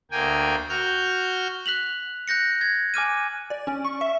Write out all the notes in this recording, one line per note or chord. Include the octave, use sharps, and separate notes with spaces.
D2 A#3 G5 G#5
F#4 F6 G6
F#6 B6 F7 F#7
F#6 G6 A#6 C#7
G#6
G#5 D6 F6 D#7
D5
C#4
C#6
E5